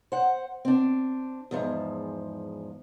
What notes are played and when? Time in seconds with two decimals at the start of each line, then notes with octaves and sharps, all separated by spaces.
0.12 C5 F#5
0.65 C4 D4
1.51 E2 G#2 F3